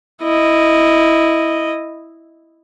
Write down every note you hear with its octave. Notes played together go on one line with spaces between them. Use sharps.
E4 D#5